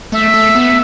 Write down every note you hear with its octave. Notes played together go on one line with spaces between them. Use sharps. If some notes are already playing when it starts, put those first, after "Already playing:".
A3 E5
A3
B3